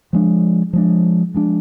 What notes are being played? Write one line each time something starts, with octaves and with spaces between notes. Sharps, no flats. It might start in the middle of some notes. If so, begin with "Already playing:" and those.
F3 G#3 D4
F3 G#3 D4
F3 G#3 D4